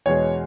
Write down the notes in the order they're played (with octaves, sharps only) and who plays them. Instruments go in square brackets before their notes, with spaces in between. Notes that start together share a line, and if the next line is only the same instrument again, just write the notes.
[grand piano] E2 B2 G#3 C#5